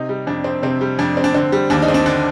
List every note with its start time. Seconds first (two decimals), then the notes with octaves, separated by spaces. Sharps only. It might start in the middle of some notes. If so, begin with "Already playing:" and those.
Already playing: C3 D#4
0.09 G3
0.27 F2 D4
0.44 C4
0.63 C3 C4
0.81 G3
0.99 F2 D4
1.17 C4
1.24 D4
1.34 D3 C4
1.52 G3
1.70 D#2 D4
1.82 D#4
1.88 C4
1.94 D4
2.06 D3 D4